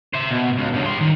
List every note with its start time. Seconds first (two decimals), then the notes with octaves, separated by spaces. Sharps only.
0.14 C5 E5
0.31 B2
0.58 C#2
0.73 G2 C#3
0.85 G3 C6
1.01 D#3